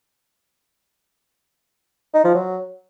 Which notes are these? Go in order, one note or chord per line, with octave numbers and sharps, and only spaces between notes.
D#4
F3
F#3